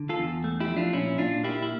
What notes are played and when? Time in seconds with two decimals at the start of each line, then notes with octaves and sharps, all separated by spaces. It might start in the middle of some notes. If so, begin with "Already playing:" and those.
Already playing: D3
0.09 F4 A4
0.19 E2
0.44 A3
0.60 E4 G4
0.68 F3
0.76 D4 F4
0.93 A#2 C#4 E4
1.18 A#2 D4 F4
1.43 A#3 E4 G4
1.63 E4